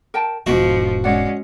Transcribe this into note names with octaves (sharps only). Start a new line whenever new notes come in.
A#4 G5 A5
E1 G#2 F3 F#4 D#5
G#3 C#4 D5 F#5